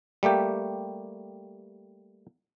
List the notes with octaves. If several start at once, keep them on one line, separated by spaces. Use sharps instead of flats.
G3 A3 A#3 G4